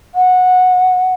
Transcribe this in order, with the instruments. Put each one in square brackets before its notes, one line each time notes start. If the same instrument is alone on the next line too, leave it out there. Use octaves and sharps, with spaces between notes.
[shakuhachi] F#5